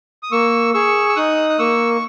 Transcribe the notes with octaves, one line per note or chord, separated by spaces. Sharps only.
D#6
A#3 C#6 E6
G#4 C#6 E6
E6
D#4 D#6 F#6
F#6
A#3 C#6 E6